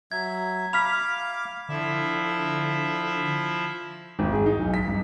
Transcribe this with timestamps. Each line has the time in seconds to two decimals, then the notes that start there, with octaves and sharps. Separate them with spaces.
0.12 F#3 E5 G#6
0.73 F5 B5 D6 F6 B6 F7
1.69 D3 F3 E4 E5
4.19 G#1
4.32 G#4
4.46 D#4
4.59 B1
4.74 B6
4.88 G2